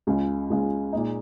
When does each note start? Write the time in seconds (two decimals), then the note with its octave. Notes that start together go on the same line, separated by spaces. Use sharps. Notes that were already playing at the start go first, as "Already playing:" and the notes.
0.07 C#2 C#3 G#3 C#4 F4
0.50 C#2 C#3 G#3 C#4 F4
0.93 A#2 G#3 D#4